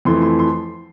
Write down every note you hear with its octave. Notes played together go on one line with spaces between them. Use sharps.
F2 E3 A3 C6
C6
C6